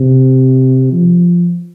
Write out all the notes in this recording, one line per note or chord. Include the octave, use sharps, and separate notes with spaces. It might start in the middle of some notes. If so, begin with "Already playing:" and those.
Already playing: C3
F3